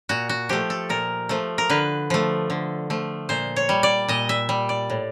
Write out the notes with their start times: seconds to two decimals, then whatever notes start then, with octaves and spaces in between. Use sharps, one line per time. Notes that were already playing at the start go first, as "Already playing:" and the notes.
0.09 A#2 F#4
0.29 F#4
0.49 F3 A3 G4
0.70 A4
0.89 A#2 A#4
1.29 F3 A3
1.58 A#4
1.70 D3 B4
2.10 F3 A3
2.50 D3
2.90 F3 A3
3.29 A#2 C5
3.56 C#5
3.69 G3
3.83 D5
4.09 A#2 D#5
4.29 E5
4.49 G3
4.69 D5
4.90 A2